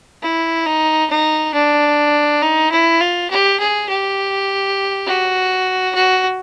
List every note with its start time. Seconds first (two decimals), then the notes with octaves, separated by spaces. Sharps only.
0.22 E4
0.66 D#4
1.10 D#4
1.54 D4
2.42 D#4
2.71 E4
3.01 F4
3.30 G4
3.60 G#4
3.89 G4
5.06 F#4
5.94 F#4